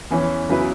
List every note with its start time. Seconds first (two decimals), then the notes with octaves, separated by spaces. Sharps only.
0.11 E2 E3 C#4
0.49 E2 C#3 F#3 E4 B4